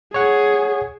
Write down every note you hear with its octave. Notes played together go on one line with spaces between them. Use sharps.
G#4 C#5 F#5